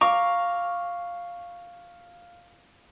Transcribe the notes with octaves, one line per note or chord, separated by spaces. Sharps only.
F5 A#5 C#6 D6